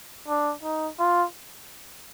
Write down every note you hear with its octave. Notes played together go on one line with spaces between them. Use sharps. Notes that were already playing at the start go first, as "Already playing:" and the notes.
D4
D#4
F4